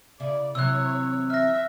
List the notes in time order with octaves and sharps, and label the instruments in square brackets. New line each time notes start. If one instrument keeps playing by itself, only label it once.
[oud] C#3 E4 [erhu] D5
[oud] C3 E3 F#3 [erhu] C#5 [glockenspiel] E6 F#6
[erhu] E5 [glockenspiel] F6 A#6